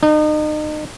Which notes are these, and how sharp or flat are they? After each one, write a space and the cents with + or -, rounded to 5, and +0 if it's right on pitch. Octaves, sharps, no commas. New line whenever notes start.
D#4 -35